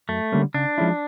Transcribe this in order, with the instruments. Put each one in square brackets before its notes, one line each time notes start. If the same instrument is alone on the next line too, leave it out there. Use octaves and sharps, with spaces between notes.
[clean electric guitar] F#2 [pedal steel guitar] A3
[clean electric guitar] D3 G3 A#3 C#4
[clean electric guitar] C#3 [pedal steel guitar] D4
[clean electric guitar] F3 G#3 C#4 E4